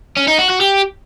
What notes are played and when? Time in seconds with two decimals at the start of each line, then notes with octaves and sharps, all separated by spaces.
0.16 C#4
0.27 D#4
0.38 F#4
0.49 F#4
0.60 G4